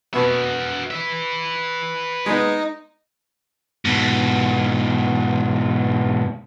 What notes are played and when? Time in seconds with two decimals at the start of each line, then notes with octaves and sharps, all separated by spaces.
0.14 B2 B3 F#4 E5
0.91 B4 E5
2.26 G#3 B3 D#4
3.85 G#2 B2